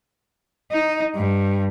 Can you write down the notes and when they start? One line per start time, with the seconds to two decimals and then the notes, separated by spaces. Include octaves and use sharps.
0.72 D#4
1.15 G2